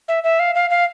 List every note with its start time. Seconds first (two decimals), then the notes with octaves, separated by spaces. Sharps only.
0.08 E5
0.24 E5
0.40 F5
0.55 F5
0.70 F5